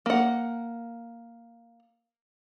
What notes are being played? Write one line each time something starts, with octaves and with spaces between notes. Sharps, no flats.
A#3 F#5